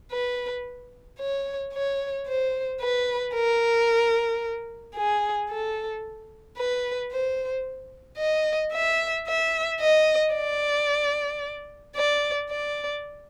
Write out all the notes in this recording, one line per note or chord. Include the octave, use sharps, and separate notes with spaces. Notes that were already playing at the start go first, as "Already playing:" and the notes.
B4
C#5
C#5
C5
B4
A#4
G#4
A4
B4
C5
D#5
E5
E5
D#5
D5
D5
D5